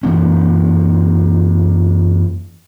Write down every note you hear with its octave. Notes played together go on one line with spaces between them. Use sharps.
F#2 E3 A#3 C#4